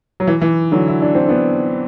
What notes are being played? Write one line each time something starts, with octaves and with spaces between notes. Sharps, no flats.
F#3
E3
E3
D3 F#3
E4
D4
C4
B3 D4